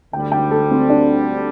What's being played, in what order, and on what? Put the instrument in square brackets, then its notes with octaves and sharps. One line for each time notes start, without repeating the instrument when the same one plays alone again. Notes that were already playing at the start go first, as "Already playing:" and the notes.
[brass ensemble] D2 D3 G3 [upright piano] G5
[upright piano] G5
A4
C4
D4